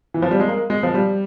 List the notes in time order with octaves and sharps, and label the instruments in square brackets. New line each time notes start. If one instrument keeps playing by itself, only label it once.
[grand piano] E3
F3
G3
G#3
A#3
G#3
F3
G3